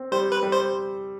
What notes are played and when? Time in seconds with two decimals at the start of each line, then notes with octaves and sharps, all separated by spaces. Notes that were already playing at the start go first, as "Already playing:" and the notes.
Already playing: C4
0.12 G3 C5
0.32 B4
0.43 G3
0.52 C5